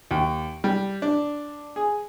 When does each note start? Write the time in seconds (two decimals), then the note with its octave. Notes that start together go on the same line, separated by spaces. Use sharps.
0.11 D#2
0.64 G3
1.02 D4
1.76 G#4